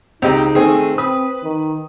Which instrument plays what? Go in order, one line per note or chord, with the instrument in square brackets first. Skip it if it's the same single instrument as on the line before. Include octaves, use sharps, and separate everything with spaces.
[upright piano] C#2 D#5 A#5 [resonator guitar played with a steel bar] C4 G4 [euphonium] D#4
[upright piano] D#3 A3 C4 [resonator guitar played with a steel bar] G#4
[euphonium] C4 [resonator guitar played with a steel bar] B4 [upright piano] D#6
[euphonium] D#3